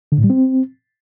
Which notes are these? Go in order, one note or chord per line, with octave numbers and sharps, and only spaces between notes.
D3
A2
G3
C4